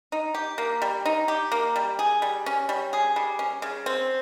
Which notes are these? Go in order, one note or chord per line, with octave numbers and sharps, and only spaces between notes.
D#4
G4
A#3
G3
D#4
G4
A#3
G3
G#4
G3
C#4
G3
G#4
G3
C#4
C#3
C4